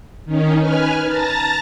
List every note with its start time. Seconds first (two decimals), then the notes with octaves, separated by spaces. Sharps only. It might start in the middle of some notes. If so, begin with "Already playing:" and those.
0.25 D#3 C#4 D#4
0.60 B4 G#5 F6
1.07 A5 A#5 A6 A#6